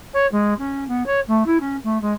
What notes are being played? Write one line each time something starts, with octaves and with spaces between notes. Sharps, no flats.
C#5
G#3
C#4
B3
C#5
A3
E4
C#4
A3
G#3